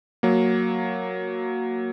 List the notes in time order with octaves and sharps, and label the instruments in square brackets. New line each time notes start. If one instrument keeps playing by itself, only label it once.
[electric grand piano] F#3 A#3